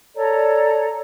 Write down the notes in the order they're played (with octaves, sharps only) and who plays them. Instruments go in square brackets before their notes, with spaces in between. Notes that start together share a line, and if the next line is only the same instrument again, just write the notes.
[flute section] A4 C#5 D5 A#5